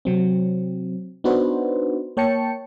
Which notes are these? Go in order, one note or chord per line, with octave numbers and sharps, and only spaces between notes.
C3 F#3 C4
B3 D4 D#4 F#4 B4 C5
A#3 C#5 G5 A5 C#7